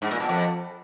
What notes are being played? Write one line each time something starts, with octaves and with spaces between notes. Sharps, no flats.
G#2
A#2
B2
F2